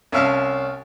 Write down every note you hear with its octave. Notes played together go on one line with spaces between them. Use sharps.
C2 C#4 E5 F5 A5 F6